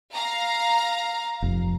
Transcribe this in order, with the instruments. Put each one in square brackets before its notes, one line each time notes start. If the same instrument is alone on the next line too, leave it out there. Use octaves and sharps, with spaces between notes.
[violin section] F5 A#5
[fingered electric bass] F1